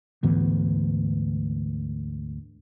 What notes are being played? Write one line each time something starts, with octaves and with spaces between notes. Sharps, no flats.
D2 G#2 E3 B3